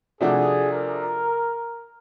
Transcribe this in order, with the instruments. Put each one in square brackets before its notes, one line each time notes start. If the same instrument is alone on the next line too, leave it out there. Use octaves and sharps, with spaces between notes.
[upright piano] C3 F3 A3 D4 F#4 [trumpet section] G#4
[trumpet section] A#4